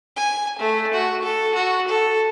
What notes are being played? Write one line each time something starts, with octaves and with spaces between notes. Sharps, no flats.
G#5
A3
F#4
A4
F#4
A4